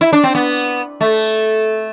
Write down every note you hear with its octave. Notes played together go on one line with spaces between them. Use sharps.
E4
D4
C4
B3
A3